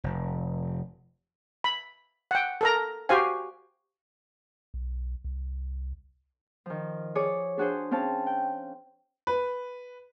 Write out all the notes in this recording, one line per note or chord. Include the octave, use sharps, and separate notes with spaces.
F1
B5
F#5 G5
A4 A#4 A#5
F#4 G4 C5 F5 G#5
B1
C2
D#3 F3
G#4 C#5 D5 D6
D4 F#4 G#4 C5
C4 C#4 F5 A5
G5
B4